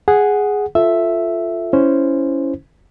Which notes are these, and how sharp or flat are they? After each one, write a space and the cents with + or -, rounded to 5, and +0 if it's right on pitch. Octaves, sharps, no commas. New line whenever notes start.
G#4 +0 F#5 +0
F4 +0 A4 +0 E5 +0
C#4 +0 E4 +0 C5 +0